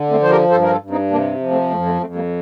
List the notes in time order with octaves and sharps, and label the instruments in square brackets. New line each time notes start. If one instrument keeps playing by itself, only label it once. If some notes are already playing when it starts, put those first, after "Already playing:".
Already playing: [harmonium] D3
A3 C4
F3 C5
G4 A#4
G2 A4 C5
A#4
F4 A4
G2
C4 D#4
C3 A#3 D4
F3
A3 C4
F2 A3 C4
A3 C4
F2 A3 C4
G3 A#3